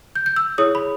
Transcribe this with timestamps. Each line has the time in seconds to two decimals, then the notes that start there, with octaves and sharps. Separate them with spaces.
0.15 G6
0.26 G6
0.36 E6
0.58 E4 G#4 C#5 D#6
0.75 B5